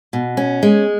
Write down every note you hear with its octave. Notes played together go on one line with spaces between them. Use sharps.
B2
C#4
G#3